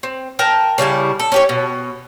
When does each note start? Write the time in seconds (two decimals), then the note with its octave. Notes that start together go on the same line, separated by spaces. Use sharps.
0.03 C4
0.39 A#4 G5 A5
0.78 C#3 G3 E4 A5
1.20 A4
1.32 C#4 G4 C#5
1.49 B2